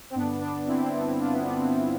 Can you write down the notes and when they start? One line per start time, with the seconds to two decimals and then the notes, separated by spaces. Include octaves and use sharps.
0.10 C4
0.15 G2 D3 B3 D4
0.41 B3 D4
0.67 C4 E4
0.80 C4
0.94 B3 D4
1.07 C4
1.19 D4 F4
1.33 B3 D4
1.45 B3 D4
1.58 C4
1.73 C4